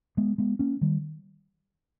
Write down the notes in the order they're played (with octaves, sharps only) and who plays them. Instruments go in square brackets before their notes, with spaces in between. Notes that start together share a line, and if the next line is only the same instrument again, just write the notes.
[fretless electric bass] G#3 B3
G#3 B3
A#3 C#4
D#3 G3